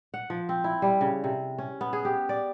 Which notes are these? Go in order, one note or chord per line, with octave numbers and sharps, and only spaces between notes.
F#5
F3
C4
E4
G3
C#3
C3
C#4
B3
G#4
G4
D5